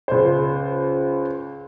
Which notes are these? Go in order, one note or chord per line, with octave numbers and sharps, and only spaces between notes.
C#2 C5